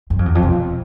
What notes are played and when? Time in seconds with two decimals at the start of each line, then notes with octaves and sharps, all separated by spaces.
0.10 F#2
0.19 F2
0.26 E2
0.35 F2
0.43 B2